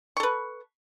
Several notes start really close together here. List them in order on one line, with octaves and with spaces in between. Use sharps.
C#6 A4 B4